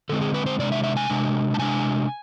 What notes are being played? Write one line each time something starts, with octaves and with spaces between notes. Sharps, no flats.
D3 G#3 C4 A4
G#4
B4
C5
C3 G#3 D4 D5
E5
E5
G#5
C3 G#3 D4
A5
C3 G#3 D4 G#5